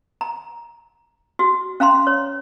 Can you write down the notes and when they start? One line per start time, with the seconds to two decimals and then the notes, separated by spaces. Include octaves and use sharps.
0.21 A#5
1.39 F#4
1.80 C#4 F5 A#5 C6
2.07 C#5